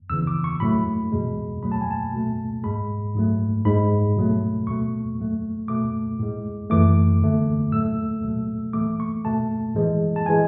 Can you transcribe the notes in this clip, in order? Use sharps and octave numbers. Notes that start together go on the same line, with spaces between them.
E2 C#3 E3 E6
D6
C#6
A2 F#3 A3 B5
E2 B2 G#3
B2 F#3 A3 B5
A5
G#5
A5
B2 A3
G#2 G#3 B5
G#2 F#3 A3
G#2 G#3 B5
B2 F#3 A3
E2 B2 A3 C#6
A2 F#3 A3
B2 A3 D6
A2 G#3
F#2 E3 A3 D6
E2 D3 A3
A2 F#3 A3 E6
B2 F#3 A3
A2 E3 A3 D6
C#6
B2 A3 A5
A2 E3 G#3
A5
E3 G#3 G#5